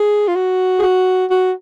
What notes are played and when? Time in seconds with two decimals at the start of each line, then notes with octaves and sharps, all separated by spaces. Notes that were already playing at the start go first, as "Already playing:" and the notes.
Already playing: G#4
0.28 F4
0.36 F#4
0.79 G#4
0.82 F#4
1.30 F#4